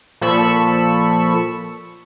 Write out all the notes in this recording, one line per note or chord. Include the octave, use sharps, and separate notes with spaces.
A#2 F3 A4 B5 C#6 E6